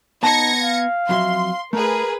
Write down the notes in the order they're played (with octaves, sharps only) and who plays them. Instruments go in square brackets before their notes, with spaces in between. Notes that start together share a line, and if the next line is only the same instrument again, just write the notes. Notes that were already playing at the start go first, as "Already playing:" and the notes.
[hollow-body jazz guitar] B3 A5 [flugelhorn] D#4 [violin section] G#6 A#6 C#7
[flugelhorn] F5
[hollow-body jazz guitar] F2 F#3 E5 [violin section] C6
[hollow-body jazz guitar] A3 [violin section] G#4 B4 [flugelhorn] A#4